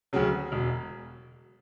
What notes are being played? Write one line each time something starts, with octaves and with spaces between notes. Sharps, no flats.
D2 C#3 F#3
E1